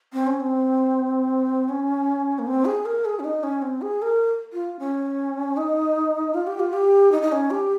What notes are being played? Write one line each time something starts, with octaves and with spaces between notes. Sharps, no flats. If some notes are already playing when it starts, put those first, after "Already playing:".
C4
C#4
C4
C#4
A#3
C4
G#4
A#4
G#4
C#4
D#4
C#4
C4
G#4
A#4
F4
C#4
D#4
F4
G4
F4
G4
D#4
D#4
C#4
G4